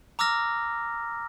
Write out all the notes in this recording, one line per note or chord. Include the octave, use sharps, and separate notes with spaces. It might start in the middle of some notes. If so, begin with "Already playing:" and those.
A#5 D6 E6 F6 A#6